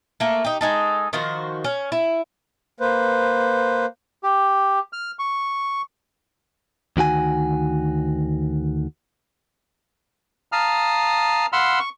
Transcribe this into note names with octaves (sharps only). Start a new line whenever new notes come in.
A3 A#3
D#4 G4
G#3 D#4 A4
D#3 F3 F#4 C5
C#4
E4
A#3 B4 C5
G4
F6
C#6
D2 D#3 F#4 G#5
F5 A5 A#5 D#6 F6
F5 F#5 B5 C6 E6 F6
C#6